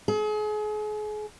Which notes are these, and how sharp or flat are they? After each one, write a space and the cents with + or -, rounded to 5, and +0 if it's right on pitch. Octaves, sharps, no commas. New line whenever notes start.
G#4 +35